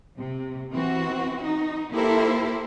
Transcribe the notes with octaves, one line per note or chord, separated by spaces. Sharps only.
C3
E3 C4 F#4
D#4
A#3 E4 G4 A4 A#4 C5